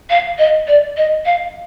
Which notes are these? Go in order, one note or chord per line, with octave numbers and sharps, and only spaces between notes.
F5
D#5
D5
D#5
F5